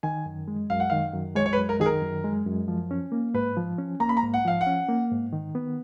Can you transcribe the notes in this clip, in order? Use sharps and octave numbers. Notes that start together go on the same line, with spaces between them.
D#3 G#5
F#2
G#3
F#2 F5
F#5
D#3 F5
F#2
G#3 C#5
C#5
B4
F#2
A#4
D#3 G#4
A#4
F#2
G#3
F#2
F3
C#4
A#3
G#2 B4
F3
C#4
A#3 A#5
B5
A#5
G#2
F#5
F3 F5
F#5
C#4
A#3
G#2
D#3
B3